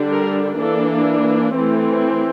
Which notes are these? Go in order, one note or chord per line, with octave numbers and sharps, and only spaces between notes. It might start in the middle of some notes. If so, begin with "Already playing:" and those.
Already playing: D3 G3 D4
A#4
E3 A#3 D4 A4
E3 A3 C4